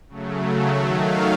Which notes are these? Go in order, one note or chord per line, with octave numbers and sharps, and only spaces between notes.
C#3 F#3 A3
D#3 F#3 A3 E5
F5